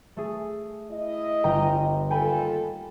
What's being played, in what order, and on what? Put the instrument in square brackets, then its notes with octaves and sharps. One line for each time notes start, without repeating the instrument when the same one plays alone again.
[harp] A3 G#4
[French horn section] E4 D#5
[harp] G1 G5 A#5
[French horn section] D#2 F4 A4 [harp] G5 G#5 B5